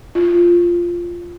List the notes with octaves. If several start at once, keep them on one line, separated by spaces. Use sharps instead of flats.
F4